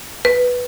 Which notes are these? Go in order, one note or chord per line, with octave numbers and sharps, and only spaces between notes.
B4